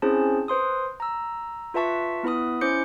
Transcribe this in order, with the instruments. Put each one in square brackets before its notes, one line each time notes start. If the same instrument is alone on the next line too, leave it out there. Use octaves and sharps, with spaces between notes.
[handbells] C4 C#4 E4 G#4 C5 A5
B4 C5 C6 D#6
A#5 E6
F4 B4 E5 A5 C#6 B6
B3 E4 B4 B5 D#6
C#4 E4 C5 D6 G6 C#7